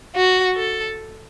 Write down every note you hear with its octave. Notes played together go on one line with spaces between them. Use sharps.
F#4
A4